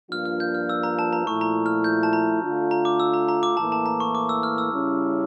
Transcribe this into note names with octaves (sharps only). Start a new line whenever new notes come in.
G2 F3 A#3 D4 F4 F6
F6
G6
F6
E6
A#5
A5
A#5
A#2 F3 A3 E4 C#6
A#5
F6
G6
A5
A#5
D3 A3 D4 F4
A#5
D6
E6
A#5
A#5
D6
A2 E3 A#3 A5
A5
A#5
C#6
D6
E6
F6
E6
C#3 G3 C#4 E4